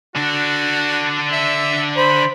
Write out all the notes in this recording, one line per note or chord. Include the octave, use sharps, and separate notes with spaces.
D3 D4 F#4
E5
C5 B5